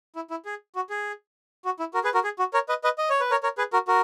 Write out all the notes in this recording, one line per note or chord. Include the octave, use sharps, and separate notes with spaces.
E4
E4
G#4
F#4
G#4
F#4
E4
F#4 A#4
G#4 B4
F#4 A#4
G#4
F#4
A#4 C#5
B4 D#5
B4 D#5
D#5
C#5
B4
A#4 C#5
A#4 C#5
G#4 B4
F#4 A#4
F#4 A#4